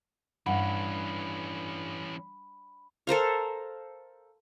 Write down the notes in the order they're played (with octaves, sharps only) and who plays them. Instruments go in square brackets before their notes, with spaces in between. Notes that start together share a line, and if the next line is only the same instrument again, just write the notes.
[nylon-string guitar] G2 [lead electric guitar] E3 C#4 [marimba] F#5 [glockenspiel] B5
[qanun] A4 A#4 C5 F5